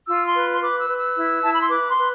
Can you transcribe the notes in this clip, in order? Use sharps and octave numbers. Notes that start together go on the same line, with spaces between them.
F4 E6
C6
B4
C6
B4 D6
E6
B4
E6
E4
E4 A5
B5
C6
B4 D6
C6
B4